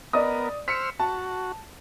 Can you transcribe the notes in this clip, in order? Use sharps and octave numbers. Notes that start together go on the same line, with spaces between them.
B3 A#4 D5 D#5 D#6
C5 E6 F6 B6 C#7
F#4 A5